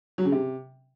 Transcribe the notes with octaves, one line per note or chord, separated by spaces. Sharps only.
F#3
C#3
C3